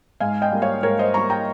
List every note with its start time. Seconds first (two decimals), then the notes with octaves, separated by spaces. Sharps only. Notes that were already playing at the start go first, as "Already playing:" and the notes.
0.20 G#2 F5 G#5
0.42 D#5 G5
0.52 G3 A#3
0.62 C#5 F5
0.83 G#2 A#4 C#5
0.99 C5 D#5
1.14 G3 A#3 A#5 C#6
1.30 G5 A#5